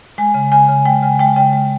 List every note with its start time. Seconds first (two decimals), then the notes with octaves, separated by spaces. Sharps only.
0.18 G#3 G#5
0.34 C#3
0.52 C#3 G#5
0.69 C#3
0.85 G#3 G5
1.03 C#3 G#5
1.19 G#3 G5
1.36 C#3 G5
1.53 G#3